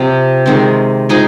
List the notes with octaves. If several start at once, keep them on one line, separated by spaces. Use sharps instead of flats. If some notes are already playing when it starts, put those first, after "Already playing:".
Already playing: C3 F3 C4
D#3 G#3 C4
F3 G#3 D#4 G#4